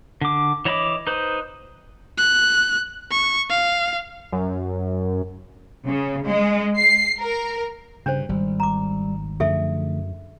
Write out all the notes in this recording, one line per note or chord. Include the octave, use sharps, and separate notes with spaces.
D3 D6
E3 C#5 D#5 B5 D6
D#4 B4 C5
F#6
C#6
F5
F#2
C#3
G#3
C7
A#4
G2 C#3 D4 C5
G#1 G3
A#5 D6
F#2 D3 F3 A3 G#4 A4 E5